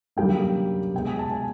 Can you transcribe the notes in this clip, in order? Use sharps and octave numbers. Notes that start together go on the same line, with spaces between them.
F#2 D3 G3 A#3 G5
B2 G#3 G5
G#5
A5
G#5